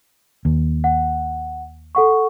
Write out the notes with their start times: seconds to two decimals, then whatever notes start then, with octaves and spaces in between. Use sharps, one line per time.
0.45 D#2
0.84 F#5
1.95 A4 F#5 C#6